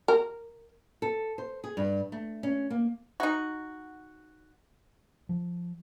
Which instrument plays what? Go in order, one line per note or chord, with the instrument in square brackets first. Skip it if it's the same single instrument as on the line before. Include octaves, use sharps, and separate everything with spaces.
[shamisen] A#4
[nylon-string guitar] A4
C5
G#4
G2
A3
C#4
A#3
[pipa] D#4 F#4
[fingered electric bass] F3